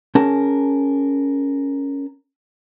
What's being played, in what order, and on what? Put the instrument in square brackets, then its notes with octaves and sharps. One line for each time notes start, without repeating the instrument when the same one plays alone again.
[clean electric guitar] C#4 G#4 A#4 A5 A#5